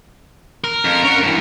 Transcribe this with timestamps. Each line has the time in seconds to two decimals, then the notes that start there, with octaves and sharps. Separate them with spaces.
0.64 A#4
0.85 F2
1.03 C#4 F#5
1.23 G2 E3